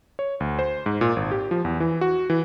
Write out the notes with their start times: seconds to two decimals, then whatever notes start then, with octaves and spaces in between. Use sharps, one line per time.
0.19 C#5
0.40 D2
0.59 C5
0.86 G#2
1.01 A#2
1.16 G#1
1.31 G4
1.51 F3
1.65 E2
1.80 E3
2.01 F#4
2.30 E3